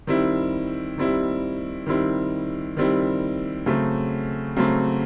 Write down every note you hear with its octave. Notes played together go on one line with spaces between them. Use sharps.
D#3 G3 C4 E4
D#3 G3 C4 E4
D#3 G3 C4 E4
D#3 G3 C4 E4
C#3 F#3 A3 C4
C#3 F#3 A3 C4